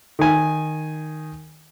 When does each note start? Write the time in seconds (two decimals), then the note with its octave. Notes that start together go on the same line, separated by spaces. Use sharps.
0.19 D#3 G#5